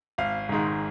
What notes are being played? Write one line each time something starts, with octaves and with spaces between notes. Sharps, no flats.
G#1 F5
G#2 D#3 G#3